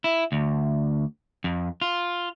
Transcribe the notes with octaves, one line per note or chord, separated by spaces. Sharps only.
E4
D2
F2
F4